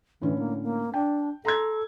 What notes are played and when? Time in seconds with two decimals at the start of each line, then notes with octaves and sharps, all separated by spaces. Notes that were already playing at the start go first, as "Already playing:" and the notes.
0.22 A2 D3 E3 C#4
0.38 A#3
0.63 A#3
0.94 D4 G5
1.45 A4 A#5 C6 G#6